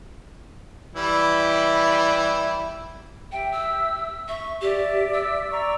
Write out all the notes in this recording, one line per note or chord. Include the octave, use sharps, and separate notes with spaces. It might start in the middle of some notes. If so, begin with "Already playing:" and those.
E3 G3 E4
G4 E5 G5
E6
E5 C#6
G4 D5 E5
E6
D5 A#5 C#6